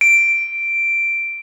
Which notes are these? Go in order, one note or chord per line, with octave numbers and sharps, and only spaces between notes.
D7